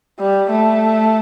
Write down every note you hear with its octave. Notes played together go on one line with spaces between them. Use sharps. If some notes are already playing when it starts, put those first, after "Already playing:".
G3
A3